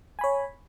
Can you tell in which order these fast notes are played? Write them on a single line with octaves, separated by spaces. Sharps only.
G#5 B5 C#5